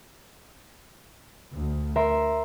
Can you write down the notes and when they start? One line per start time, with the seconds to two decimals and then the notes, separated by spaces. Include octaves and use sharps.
1.56 D2
1.96 A#4 E5 C6